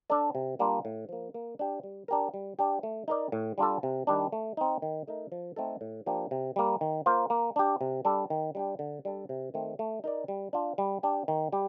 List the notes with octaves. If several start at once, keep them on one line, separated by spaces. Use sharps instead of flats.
D4 A4 D5
C3
G3 A#3 D4 F4
A2
F3 A#3
A#3
D4 G4
G3
D4 G4 A#4
G3
D4 G4
A3
D#4 A#4 D5
A2
G3 D4 F4 A4
C3
D#3 G3 D4
A3
C4 D#4
D#3
A3 D#4 A#4
F3
A3 C4 D#4 A4
A2
F3 A#3 D4 G4
C3
G3 A#3
D#3
A#3 F4 C5
A#3
D4 G4
C3
G3 D4 A4
D#3
G3 D4 G4
D3
G3 D4 A4
C3
D#3 A3 C4
A3
D#4 A#4 D5
G3
D4 F4
G3
D4 G4
D#3
G3 G4